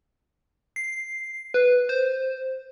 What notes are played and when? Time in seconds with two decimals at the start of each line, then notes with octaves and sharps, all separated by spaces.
0.76 C7
1.54 B4
1.89 C5